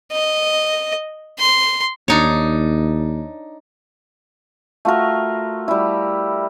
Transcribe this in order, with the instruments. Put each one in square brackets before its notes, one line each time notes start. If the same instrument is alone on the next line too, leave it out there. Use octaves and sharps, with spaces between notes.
[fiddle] D#5
C6
[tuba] D#2 [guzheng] D4 D#4 C#5
[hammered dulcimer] A3 F4 F#4 A#4
G3 E4